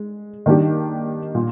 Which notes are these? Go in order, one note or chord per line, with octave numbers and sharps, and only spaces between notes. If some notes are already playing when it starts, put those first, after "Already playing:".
Already playing: G#3
D#3 A#3 D4 G4
A#2